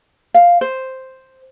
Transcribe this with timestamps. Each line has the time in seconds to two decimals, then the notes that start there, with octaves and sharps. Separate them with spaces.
0.34 F5
0.61 C5